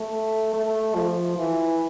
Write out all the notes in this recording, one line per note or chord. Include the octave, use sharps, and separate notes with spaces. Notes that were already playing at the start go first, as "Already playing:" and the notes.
Already playing: A3
A3
F3
E3